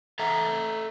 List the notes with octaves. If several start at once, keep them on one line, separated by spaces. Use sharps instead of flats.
A4 E5 F#5 A#5